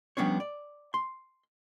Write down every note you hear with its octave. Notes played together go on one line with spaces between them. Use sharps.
F3 G3 B3 C#4 D4 C#5
D5
C6